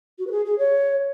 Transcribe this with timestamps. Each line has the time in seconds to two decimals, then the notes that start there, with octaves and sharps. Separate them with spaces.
0.18 F#4
0.26 B4
0.31 G#4
0.45 G#4
0.58 C#5